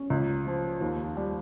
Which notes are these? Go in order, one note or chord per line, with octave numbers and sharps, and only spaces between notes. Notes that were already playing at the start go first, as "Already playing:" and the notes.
Already playing: C#4
C#2
F3
D#2
G3